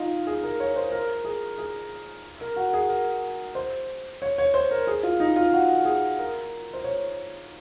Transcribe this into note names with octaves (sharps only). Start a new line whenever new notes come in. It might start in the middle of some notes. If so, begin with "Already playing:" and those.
Already playing: D#4 F4
G#4
A#4
C#5
C5
A#4
G#4
G#4
A#4
F#4
G#4
A#4
C5
C#5
C#5
C5
A#4
G#4
F4
D#4
F4
F#4
G#4
A#4
C5
C#5